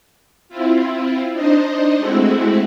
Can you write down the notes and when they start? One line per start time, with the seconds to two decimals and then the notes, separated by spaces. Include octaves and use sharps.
0.49 C4 E4 F4
1.33 D4 D#4 C5 D#5
1.98 G#3 A3 C4 E4 F#4